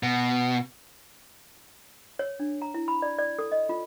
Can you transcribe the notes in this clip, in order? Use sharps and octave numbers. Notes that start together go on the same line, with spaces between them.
B2
C#5
D4
A#5
E4
B5
D5
D5
A4
D#5
F4